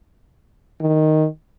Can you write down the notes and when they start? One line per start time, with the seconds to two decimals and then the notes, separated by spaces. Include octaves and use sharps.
0.78 D#3